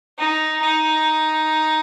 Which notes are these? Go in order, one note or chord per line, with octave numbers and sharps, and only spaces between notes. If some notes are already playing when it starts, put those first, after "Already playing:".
D#4
D#4